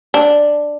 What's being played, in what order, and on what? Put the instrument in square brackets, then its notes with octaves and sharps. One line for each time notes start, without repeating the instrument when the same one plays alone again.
[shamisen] D4